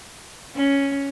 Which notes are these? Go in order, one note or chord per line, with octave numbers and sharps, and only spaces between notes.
C#4